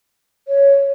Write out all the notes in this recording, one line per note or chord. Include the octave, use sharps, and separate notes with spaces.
C#5